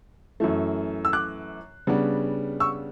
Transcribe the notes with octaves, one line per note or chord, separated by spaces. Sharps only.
F#2 E3 A3
E6
D6 F#6
C#3 G3 B3 D4
C#6 E6